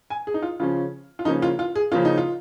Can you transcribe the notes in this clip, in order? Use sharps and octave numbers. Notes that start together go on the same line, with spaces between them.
G#5
G#4
D#4
F4
C#3 F3 C#4 F4
F4
C#3 F3 A#3 C#4 D#4
F4
F4
G#4
C#3 F3 A#3 C#4 F4
D#4
F4